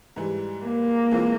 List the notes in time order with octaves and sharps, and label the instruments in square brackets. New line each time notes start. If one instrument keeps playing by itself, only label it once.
[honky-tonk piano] G#2 E3 G3
[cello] A#3
[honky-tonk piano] E3 G#3 C4 F4